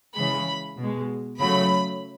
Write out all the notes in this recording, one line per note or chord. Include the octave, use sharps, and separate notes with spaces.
C#3 E3 G#3 B5
B2 G#3
C#3 F#3 A3 B5